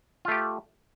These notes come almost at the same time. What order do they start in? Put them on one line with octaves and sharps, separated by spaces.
F4 A3 G4